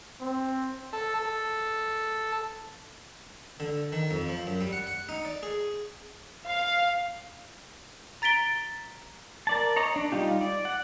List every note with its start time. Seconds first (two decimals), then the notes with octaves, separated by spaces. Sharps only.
0.21 C4
0.93 A4
1.19 A4
3.60 D3
3.92 D#3
4.11 F2
4.28 F3
4.47 F#2
4.61 G3
4.73 F#5
4.87 F#5
5.09 D#4
5.25 D5
5.43 G#4
6.46 F5
8.22 A#5 A6 B6 D7 G7
9.47 A#4 D5 A5
9.76 C#5 D#5 A#5
9.96 D4
10.12 G3 D#4 F4 G4
10.41 D5
10.65 F#5